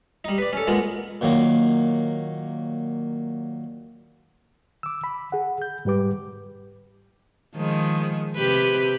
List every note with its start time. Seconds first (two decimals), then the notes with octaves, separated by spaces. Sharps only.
0.24 G3 D#4
0.38 B4 D5
0.53 C#4 A4
0.67 A#2 G#3 B3 A#4
1.21 A#2 D#3 F#3 A#3
4.83 D6 E6
5.04 B5
5.32 G#4 F#5
5.62 G6
5.85 G#2 G3 G4 B4 D6
7.56 D#3 F3 G#3
8.36 C3 G4 B4